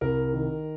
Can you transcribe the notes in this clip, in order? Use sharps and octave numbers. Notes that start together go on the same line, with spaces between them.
C2 A#4
D#3